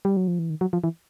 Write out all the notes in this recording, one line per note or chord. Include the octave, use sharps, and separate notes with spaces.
G3
F#3
F3
E3
D#3
F#3
F3
E3